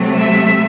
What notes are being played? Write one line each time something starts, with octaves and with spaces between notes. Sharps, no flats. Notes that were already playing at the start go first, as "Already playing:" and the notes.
Already playing: C3 F#3 A3
E5